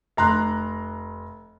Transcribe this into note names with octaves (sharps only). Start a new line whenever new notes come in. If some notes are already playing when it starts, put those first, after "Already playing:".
F1 A#5 C6 F#6